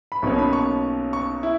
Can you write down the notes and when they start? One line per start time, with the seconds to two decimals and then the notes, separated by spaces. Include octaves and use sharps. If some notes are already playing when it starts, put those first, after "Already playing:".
0.12 B5
0.22 B1 B2 A#3 C#4 C#6
0.38 B5
0.53 C#6
1.13 C#6
1.43 E4